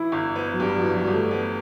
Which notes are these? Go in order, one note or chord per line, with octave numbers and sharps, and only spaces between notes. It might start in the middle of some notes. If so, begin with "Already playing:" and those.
Already playing: E3 E4
G1
B3
F#3
G2 G3
F#3
E3
F#3
G1 G3
A3
B3